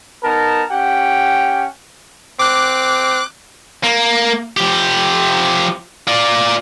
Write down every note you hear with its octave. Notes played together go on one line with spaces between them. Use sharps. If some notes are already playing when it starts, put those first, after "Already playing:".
B3 D#4 A#4 A5
C#4 G4 F#5 G5
C4 D6 F#6
A#3
F3 G4
F4 D5